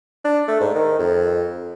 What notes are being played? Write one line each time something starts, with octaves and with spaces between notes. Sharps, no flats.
D4
A3
G#2
D#3
F2